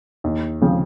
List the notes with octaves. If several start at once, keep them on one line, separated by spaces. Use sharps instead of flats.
D#2
C#3 F3 G#3 C4